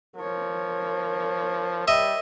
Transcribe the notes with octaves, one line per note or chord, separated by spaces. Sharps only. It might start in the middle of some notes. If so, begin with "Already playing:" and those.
F3 A#4 C#5
G3 D#5 E5